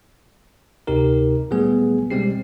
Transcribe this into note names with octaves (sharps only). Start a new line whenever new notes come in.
D2 C3 D#4 G4 A#4
A#2 F#3 G3 A3 B3 G#4
B2 G3 G#3 C4 G4 C7